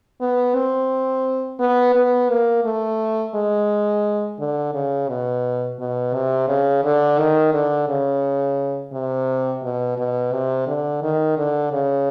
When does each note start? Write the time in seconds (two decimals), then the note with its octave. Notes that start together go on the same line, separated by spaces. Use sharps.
0.21 B3
0.55 C4
1.60 B3
1.95 B3
2.30 A#3
2.65 A3
3.35 G#3
4.39 D3
4.74 C#3
5.09 B2
5.80 B2
6.14 C3
6.49 C#3
6.84 D3
7.19 D#3
7.54 D3
7.89 C#3
8.93 C3
9.63 B2
9.98 B2
10.33 C3
10.67 D3
11.03 D#3
11.38 D3
11.72 C#3